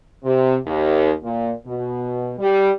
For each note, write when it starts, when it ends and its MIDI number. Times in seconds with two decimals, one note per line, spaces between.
0.24 0.56 48
0.65 1.10 39
1.23 1.51 46
1.66 2.32 47
2.39 2.70 55